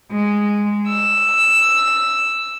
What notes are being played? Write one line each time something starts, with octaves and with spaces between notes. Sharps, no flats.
G#3
E6